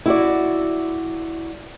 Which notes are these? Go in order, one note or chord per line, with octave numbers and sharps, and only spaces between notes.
E4 F#4 D5